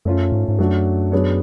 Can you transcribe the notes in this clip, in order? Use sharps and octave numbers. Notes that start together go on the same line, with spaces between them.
F#2 A3 C#4 F4
G#2
G#2
F#2 F#3 A3 D4 F#4
F#3 B3 D4 G#4 C#5